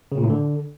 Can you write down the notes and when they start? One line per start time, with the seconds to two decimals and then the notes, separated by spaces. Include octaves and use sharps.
0.12 C#3
0.18 A#2
0.24 A2
0.30 D3